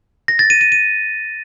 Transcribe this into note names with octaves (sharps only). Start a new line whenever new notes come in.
A#6
A6
D#7
D#7
D#7